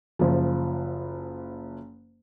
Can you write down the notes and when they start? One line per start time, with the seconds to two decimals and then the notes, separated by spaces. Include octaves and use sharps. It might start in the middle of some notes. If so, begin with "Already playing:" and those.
0.19 F#1 F3